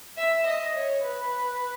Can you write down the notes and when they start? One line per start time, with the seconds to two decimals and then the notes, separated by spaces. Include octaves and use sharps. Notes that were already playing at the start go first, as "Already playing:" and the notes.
0.17 E5
0.46 D#5
0.74 C#5
1.02 B4